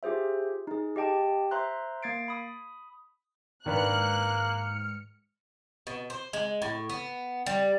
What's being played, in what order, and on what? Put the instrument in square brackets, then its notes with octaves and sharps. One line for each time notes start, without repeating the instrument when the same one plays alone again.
[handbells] F4 G4 G#4 C5 E5
D#4 G#4
G4 D#5 G5 A5
C5 E5 A#5 C6 F#6
A#3 G#6 A6 C7 D7
B5 D#6
[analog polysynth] G#2 F6 C#7 [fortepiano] D#3 D4 B4 [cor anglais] A#3 [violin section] F#6
[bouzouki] B2
C5
G#3
A2
B3
G3